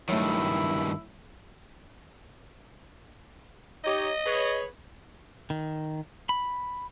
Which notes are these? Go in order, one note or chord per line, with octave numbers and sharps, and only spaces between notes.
G2 D#3 F#3 A3 E4
D#4 G4 C#5 D#5
G#4 B4 C#5
D#3
B5